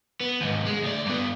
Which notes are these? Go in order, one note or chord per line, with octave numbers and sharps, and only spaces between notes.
B3
D#2 G#2
G#3
D2 D5
G2 B3